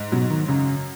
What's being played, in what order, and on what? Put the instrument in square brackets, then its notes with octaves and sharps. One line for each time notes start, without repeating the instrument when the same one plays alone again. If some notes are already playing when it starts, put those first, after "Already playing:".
Already playing: [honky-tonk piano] G#2
[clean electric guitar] B2 [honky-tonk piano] F#3
[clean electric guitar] D#3
[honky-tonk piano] F#2 [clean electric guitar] C#3